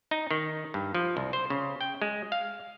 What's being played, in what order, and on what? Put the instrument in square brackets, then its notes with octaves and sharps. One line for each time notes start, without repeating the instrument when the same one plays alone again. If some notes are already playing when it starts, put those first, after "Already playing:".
[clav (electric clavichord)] D#4
D#3
G2
F3
C2
C5
C#3
G5
G#3
F5